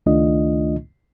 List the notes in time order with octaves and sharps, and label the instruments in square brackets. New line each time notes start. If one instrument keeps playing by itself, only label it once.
[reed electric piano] C#2 D#3 A3 D4 F4 D#5